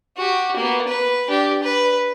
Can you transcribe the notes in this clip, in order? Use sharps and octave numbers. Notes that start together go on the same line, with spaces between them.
F#4 G4
A#3 B3
B4
D4 G4
B4